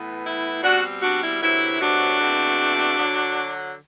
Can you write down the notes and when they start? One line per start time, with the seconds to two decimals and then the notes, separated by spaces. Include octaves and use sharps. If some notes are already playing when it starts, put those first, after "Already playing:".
Already playing: A2 E3 B3
0.25 E4
0.63 B2 G3 C4 D4 F#4
1.01 D4 F#4
1.21 E4
1.40 D2 C3 F#3 B3 E4
1.79 D4 F#4
2.18 E2 B2 A3 C4
2.97 D3 F#3